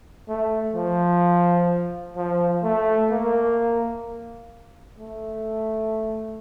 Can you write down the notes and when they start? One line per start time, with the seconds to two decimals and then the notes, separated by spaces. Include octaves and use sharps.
0.28 A3
0.75 F3
2.17 F3
2.63 A3
3.11 A#3
4.99 A3